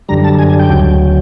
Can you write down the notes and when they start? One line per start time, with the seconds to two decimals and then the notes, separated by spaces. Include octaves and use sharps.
0.09 F#2 D3 G3 A#5
0.24 A5
0.39 G#5
0.50 G#5
0.59 G5
0.70 D2 C#3 F#3